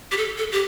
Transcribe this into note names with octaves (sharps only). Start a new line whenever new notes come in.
G4
A4
A4
G4